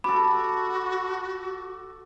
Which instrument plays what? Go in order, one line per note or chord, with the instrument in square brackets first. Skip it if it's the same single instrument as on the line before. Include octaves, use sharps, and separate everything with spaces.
[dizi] F#4 [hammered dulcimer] A4 D6 [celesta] B5